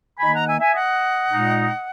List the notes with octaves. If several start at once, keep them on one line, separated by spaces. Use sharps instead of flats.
D#3 A#3 D#4 G#5 B5
F#5 A#5
E5 G#5
E5 G#5
D#5 F#5
A#2 G#3 D#4